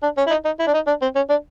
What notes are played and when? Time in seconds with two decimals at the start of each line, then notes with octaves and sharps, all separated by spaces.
0.03 D4
0.17 C#4
0.27 E4
0.30 D#4
0.45 D#4
0.59 E4
0.67 D4
0.74 D#4
0.87 D4
1.02 C4
1.16 C#4
1.30 D4